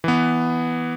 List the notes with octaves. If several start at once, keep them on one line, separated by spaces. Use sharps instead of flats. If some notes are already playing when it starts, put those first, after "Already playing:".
E3 B3